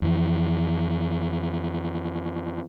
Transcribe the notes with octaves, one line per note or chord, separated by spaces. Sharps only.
F2 E3